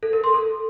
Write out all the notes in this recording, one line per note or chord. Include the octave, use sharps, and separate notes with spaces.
A4
A#4
C6
A4